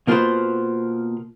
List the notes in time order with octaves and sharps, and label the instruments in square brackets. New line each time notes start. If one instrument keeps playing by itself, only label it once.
[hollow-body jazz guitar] B2 A#3 F4 F#4 B4 C5